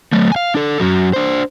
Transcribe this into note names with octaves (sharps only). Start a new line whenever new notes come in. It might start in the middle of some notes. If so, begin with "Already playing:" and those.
F#3 A3
F5 G#5
D4 A4
F#2 F#3
D4 C5